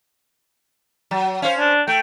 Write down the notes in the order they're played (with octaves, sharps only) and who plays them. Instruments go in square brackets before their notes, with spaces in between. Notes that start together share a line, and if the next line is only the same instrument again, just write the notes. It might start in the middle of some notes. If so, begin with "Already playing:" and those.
[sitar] F#3
[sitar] C#4 C5 [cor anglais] F5
[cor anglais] D4
[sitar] A3 [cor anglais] G5